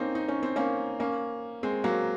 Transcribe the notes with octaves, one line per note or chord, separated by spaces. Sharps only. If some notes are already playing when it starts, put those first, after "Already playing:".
Already playing: A#3 C4 C#4 D#4
D#4
C#4
C4
A#3 C#4
A#3 C#4
G#3 C4
F#3 A#3